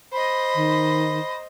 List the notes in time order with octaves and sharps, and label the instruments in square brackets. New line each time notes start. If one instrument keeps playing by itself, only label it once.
[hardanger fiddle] C5 D#5 [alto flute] B5
[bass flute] D#3